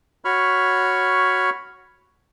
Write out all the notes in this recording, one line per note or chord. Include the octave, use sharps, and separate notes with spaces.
F#4 C#5 B5 C#6 F6